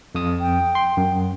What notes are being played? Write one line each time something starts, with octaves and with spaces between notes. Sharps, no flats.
F2 D#6
G5
C6
F#2